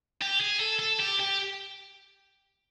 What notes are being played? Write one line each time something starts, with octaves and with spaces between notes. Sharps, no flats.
G4
G#4
A4
A4
G4
G4